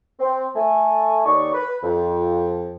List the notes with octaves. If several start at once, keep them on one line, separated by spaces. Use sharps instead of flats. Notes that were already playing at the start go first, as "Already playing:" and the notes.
C4
A3 G#5
D#2 D#4 C#5 D5 C#6
B4
F2